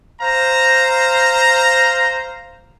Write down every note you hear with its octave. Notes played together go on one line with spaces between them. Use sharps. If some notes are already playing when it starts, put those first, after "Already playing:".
C5 F5 A#5